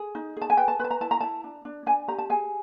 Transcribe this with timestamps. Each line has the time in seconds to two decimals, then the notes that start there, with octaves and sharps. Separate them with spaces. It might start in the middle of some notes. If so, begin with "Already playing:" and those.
Already playing: G#4
0.15 D#4
0.37 G#4 A5
0.50 G#5
0.57 B4 G5
0.68 A5
0.79 B4 B5
0.84 A5
0.91 A#5
1.01 E4 A5
1.11 A#5
1.20 E4 A5
1.44 D4
1.65 D4
1.86 D4 G#5
2.08 G4 A#5
2.18 A5
2.30 G#4 G#5